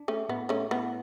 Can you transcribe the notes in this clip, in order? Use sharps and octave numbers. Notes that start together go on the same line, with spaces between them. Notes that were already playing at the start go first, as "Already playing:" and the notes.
Already playing: D4
A3 C#4
A2 B3
A3 C#4
A2 B3